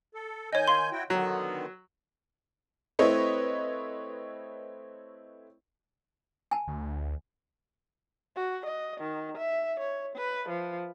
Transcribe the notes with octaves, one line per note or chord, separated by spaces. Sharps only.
A4
D#3 C#5 D#5 G#5 G6
F5 C6
E4 F#4 G5
D3 D#3 F#3 B3
A3 C4 E4 B4 C#5 D#5
G#5 A5
D2
F#4
D#5
D#3
E5
C#5
B4
F3